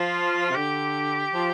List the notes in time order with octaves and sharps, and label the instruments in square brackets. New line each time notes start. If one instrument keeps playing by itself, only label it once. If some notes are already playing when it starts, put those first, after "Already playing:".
Already playing: [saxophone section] F3 [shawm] F4
[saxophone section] C3
[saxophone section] D3 [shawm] G4
[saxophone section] F3